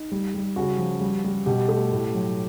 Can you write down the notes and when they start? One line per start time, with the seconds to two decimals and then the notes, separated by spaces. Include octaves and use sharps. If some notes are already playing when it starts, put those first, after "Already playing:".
Already playing: D#4
0.12 G3
0.34 G3
0.56 C#3 F#4
0.78 F3
1.01 G3
1.24 G3
1.46 B2 G4
1.68 A3
1.91 A2
2.15 F#3